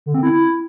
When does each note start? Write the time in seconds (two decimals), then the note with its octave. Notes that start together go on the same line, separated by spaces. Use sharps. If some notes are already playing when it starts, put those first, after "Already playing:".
0.06 D3
0.14 C4
0.23 E4